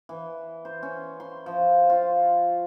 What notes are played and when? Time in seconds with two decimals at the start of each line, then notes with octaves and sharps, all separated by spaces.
0.09 E3
0.65 C5
0.83 C#4
1.20 C6
1.46 F3
1.90 F4